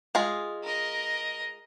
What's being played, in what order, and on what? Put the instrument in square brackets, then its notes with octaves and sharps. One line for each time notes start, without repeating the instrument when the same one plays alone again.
[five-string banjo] G#3 F4 G#4
[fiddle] A#4 D#5